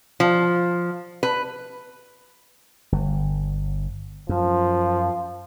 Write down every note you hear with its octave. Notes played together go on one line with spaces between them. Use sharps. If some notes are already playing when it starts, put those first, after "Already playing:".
F3
B4
G1
F#2 F3